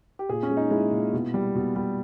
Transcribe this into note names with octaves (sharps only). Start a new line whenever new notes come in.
G4
A#2 G#4
C#4
G#3
D#4
G#3 E4
A#2
B2
G3
B2
G3